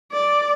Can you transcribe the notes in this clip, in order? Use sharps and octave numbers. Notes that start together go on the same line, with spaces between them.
D5